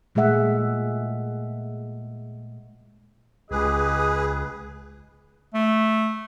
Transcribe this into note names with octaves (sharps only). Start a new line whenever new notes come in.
A#2 G#3 A3 G#4 E5 F#5
C#2 G4 G#4 B4 D#5 D#6
A3